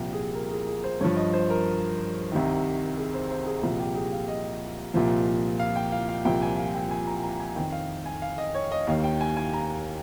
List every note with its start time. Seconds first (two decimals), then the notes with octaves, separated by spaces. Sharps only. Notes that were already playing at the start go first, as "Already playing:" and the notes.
Already playing: C2 A#2 F3 G4
0.13 G#4
0.35 A#4
0.51 G#4
0.67 G#4
0.84 C5
1.00 G2 F3 C#5
1.16 D#5
1.33 C5
1.50 A#4
2.32 C2 C3 D#3
2.97 G#4
3.14 C5
3.30 C5
3.46 G#4
3.62 C2 A#2 F3 G#4
3.79 G4
3.95 G#4
4.12 F5
4.28 D#5
4.94 C2 A#2 F3
5.60 F5
5.76 G5
5.92 F5
6.09 F5
6.25 C2 A#2 F3 G5
6.42 G#5
6.58 F5
6.75 G5
6.91 G#5
7.07 A#5
7.23 A#5
7.40 G#5
7.56 F2 D#3 G5
7.72 F5
8.06 G#5
8.22 F5
8.38 D#5
8.54 C#5
8.72 D#5
8.87 D#2 D#3 F5
9.04 G5
9.21 G#5
9.37 G#5
9.53 A#5